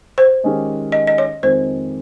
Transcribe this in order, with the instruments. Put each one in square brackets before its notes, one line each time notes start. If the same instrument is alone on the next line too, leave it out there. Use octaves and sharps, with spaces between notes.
[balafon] C5
[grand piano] D#3 G#3 C#4 G4
[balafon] D#5
D#5
C#5
[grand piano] F2 D#3 G#3 C4 [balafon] C5